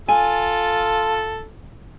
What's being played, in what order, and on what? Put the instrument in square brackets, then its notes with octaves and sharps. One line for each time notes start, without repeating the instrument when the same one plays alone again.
[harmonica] F4 A4 [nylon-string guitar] G#5